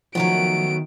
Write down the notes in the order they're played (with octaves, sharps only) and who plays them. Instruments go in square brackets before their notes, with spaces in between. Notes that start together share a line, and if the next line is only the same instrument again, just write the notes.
[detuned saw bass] D#3 [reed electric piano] F3 [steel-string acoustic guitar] F#3 A3 B3 [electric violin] D7